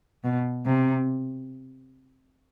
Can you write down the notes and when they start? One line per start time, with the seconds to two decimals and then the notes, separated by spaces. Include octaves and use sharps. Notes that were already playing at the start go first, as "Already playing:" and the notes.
0.24 B2
0.66 C3